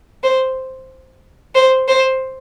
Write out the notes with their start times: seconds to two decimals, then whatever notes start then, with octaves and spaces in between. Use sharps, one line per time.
0.23 C5
1.55 C5
1.88 C5